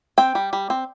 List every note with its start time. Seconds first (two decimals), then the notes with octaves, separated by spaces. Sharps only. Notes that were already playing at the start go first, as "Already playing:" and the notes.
0.18 C4 G5
0.35 G3
0.53 G3
0.70 C4